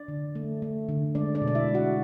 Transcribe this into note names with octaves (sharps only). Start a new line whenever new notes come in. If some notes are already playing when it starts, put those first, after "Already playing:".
Already playing: D4 D5
D3
A3
A3
D3
G#3 D4 D5
D4 D5
B2
D5
E4 E5
G#3
F#4 F#5